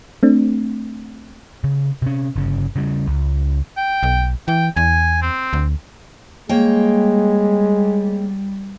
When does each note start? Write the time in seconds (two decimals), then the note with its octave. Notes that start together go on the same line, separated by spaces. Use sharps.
0.23 A3 C4 D4
1.64 C#3
2.02 C3 C#4
2.36 G1 C#3
2.76 C#3 G3
3.07 C#2
3.77 G5
4.03 B1
4.48 E3 G5
4.77 E2 G#5
5.22 C4
5.53 D2
6.49 G3 G#3 A#3 C#5 G5